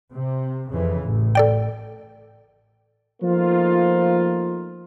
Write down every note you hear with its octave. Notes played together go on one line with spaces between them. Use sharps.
C3
F2 C#3 E3
A1
A4 D5 G5
F3 A3 A#3 D#4 F4